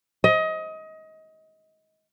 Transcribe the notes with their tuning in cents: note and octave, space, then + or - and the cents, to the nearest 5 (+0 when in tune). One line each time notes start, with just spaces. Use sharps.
D#5 +25